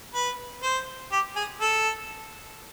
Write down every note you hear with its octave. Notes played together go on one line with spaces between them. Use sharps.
B4
C5
G4
G#4
A4